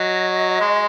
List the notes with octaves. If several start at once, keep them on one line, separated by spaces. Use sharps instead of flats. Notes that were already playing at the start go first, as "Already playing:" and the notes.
Already playing: F#3 D#5
G#3